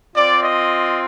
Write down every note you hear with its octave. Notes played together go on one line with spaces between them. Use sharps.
C4 F4 D5
D#5